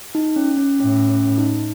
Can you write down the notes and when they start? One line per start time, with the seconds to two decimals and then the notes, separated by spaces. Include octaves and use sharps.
0.15 D#4
0.36 C#4
0.57 C#4
0.80 A2 C#4
1.09 C#4
1.38 D#4